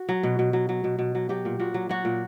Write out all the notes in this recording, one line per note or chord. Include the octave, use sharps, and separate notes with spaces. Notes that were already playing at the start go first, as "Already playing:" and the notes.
Already playing: F#4
F#3
B2
B2
F#3
F#3
B2
B2
F#3
F#3 G4
A#2
A#2 F#4
F#3
F#3 F#4
A#2